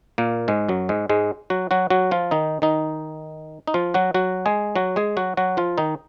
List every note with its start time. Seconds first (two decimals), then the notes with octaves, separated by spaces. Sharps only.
0.18 A#2 A#3
0.48 G#2 G#3
0.69 F#2 F#3
0.89 G#2 G#3
1.09 G#2 G#3
1.50 F#3 F#4
1.71 F#3 F#4
1.90 F#3 F#4
2.11 F3 F4
2.31 D#3 D#4
2.62 D#3 D#4
3.67 D#4
3.74 F3 F4
3.94 F#3 F#4
4.14 F#3 F#4
4.46 G#3 G#4
4.76 F#3 F#4
4.96 G#3 G#4
5.17 F#3 F#4
5.37 F#3 F#4
5.57 F3 F4
5.78 D#3 D#4